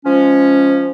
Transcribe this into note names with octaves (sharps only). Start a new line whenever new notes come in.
F3 G#3 C#4